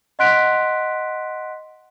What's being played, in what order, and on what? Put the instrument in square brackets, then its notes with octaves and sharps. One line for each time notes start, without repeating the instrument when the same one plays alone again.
[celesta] D#5 F#5 C6 F#6 B6 D7